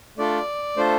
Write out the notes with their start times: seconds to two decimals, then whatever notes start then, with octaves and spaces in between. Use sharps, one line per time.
0.17 A3 D4 F4 A4 D5
0.77 A3 D4 F4 A4 C5